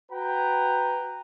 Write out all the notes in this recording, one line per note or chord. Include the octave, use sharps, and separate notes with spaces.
F#4 B4 G5 A#5